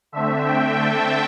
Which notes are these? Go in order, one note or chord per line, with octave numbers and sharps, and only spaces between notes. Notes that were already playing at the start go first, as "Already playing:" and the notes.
D3 A3 C4 E5
G5
A5